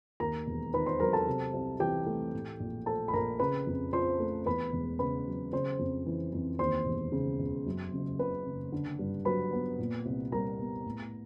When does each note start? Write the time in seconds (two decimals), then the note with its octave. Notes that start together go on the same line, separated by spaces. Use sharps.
0.20 D#2 A#4 A#5
0.47 E1
0.74 D#3 B4 B5
0.86 C5 C6
1.00 F#3 A#4 A#5
1.13 A4 A5
1.27 C3
1.53 C2
1.80 E3 G4 G5
2.07 A3
2.34 A2
2.60 A#1
2.86 F3 A4 A5
3.08 B5
3.13 A#1 A#4 A#5
3.39 C#3 B4 B5
3.67 F2
3.93 F3 C5 C6
4.20 A3
4.46 E2 B4 B5
4.73 E1
4.99 C#3 B4 B5
5.26 F#3
5.53 C#3 C5 C6
5.79 F2
6.06 E3
6.33 F2
6.59 D#2 C5 C6
6.86 E1
7.12 C#3
7.39 E1
7.66 F#2
7.93 F#1
8.19 C#3 B4 B5
8.46 F#1
8.72 D3
8.99 G2
9.25 F#3 B4 B5
9.53 B3
9.79 A#2
10.05 C2
10.32 G3 A#4 A#5
10.59 B3
10.85 A2